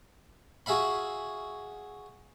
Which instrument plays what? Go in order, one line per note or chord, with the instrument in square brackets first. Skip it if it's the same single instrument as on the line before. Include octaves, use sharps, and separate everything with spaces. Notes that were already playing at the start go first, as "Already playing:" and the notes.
[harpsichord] F#4 G#4 E5 F5 B5